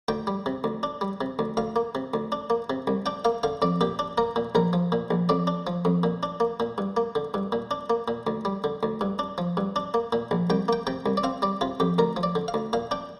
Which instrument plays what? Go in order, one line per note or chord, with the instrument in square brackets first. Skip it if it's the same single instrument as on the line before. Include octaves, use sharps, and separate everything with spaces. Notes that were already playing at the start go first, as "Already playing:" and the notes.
[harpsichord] D2 G5
G3
C3
D2
D4
G3
C3
D2
D2 F5
A#3
C3
D2
D4
A#3
C3
C2
D4 G5
A#3 F5
D3 F5
F2 D5
A#2 G4
D4
A#3 A#4
A#2
A#1 A#4
F3
A#2
A#1
F2 D5
D4
F3
F2
A#2
D4
A#3
A#2
G2
A#3
D3
G2
A#2
D4
A#3
A#2
D2
G3
D3
D2
G2
D4
F3
G2
D4
A#3
A#2
A#1
C2 G5
A#3 G5
C3 G5
C2
D5
C4 F5
G3 D5
C3 F4
F2 G4
D2 A#4
F3
D5
D3
F5
D2
A#2 F5
D4 G5